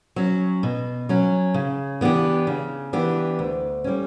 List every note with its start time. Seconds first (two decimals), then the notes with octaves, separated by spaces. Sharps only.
0.16 F#3 C#4
0.63 B2
1.09 F#3 C#4
1.54 C#3
2.01 E3 B3 D4 G4
2.47 C#3
2.93 E3 B3 D4 G4
3.39 D2
3.84 D3 G3 C#4